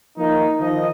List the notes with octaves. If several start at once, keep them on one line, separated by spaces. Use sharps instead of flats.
F3 A#3 D#4
D#3 F3 D#5